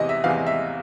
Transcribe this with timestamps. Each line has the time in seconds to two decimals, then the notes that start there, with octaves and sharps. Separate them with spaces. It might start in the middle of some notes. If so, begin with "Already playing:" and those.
Already playing: E2 C3 E3 D#5
0.09 E5
0.24 E2 C3 E3 F5
0.47 E5